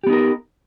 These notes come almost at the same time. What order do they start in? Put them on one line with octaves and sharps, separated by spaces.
G4 B3 D#4 A#4